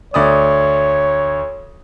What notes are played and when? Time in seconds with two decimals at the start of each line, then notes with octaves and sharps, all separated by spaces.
0.14 D2 C#5 D5 D#6